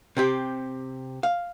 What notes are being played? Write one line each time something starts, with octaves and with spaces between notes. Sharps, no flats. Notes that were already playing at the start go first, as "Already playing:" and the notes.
C3 C4 G4
F5